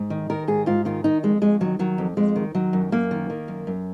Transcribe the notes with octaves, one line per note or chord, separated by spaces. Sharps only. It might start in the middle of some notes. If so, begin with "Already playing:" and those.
Already playing: G#2
D#3
D#3 A#4
G#2 G#4
G#2 F4
D#3 F4
D#3 D#4
F2 G#3
F2 G#3
D#3 F#3
D#3 F#3
F2
F2 G#3
D#3
D#3 F#3
F#2
F#2 A#3
D#3
D#3
F#2
F#2